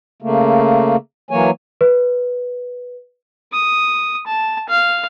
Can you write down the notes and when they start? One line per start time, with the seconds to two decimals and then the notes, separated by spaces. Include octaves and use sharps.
0.22 C#3 A3 A#3
1.31 E3 F#3 A#3 C#5 G#5
1.81 B4
3.52 D#6
4.27 A5
4.69 F5